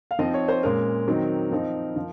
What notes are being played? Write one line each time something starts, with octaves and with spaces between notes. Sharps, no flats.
F5
F3 C4 D#4 D#5
C#5
C5
A#2 G#3 C#4 A#4
D#3 F#3 C4 D#4
F3 C4 D#4
F3